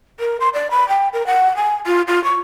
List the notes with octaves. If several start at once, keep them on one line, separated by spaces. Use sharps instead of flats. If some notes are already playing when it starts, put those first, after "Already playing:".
A#4
C6
D5
B5
G5
A#4
F#5
G#5
F4
F4
C#6